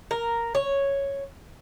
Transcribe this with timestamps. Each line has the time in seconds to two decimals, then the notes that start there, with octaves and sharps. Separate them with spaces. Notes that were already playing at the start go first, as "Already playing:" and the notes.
0.11 A#4
0.55 C#5